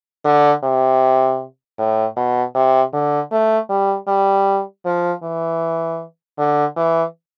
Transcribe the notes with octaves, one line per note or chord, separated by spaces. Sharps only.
D3
C3
A2
B2
C3
D3
A3
G3
G3
F3
E3
D3
E3